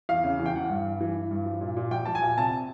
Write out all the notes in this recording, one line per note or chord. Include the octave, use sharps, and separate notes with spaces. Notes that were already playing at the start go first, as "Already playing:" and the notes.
E2 F5
C#3
E2
G5
E3 F#5
G2
G2
E3
E3
G2
F3
A#2
A#2
F3 G5
F3 A5
G#5
A#2
C3 A5